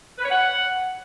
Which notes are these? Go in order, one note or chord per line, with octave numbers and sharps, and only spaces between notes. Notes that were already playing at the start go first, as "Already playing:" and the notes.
B4
C#5
F#5